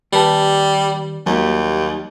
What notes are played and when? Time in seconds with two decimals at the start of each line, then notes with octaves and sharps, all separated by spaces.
0.13 D#2 G3 B4 A5
1.26 D#2 F#3 G3 A#3